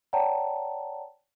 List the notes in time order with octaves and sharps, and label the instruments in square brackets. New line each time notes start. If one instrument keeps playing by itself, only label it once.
[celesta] C#5 D5 F#5 G5 A5 A#5